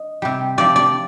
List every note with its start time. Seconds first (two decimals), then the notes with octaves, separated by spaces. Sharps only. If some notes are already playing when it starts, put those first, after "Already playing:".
Already playing: D#5
0.22 C3 G3
0.58 C3 F3 D5
0.76 D5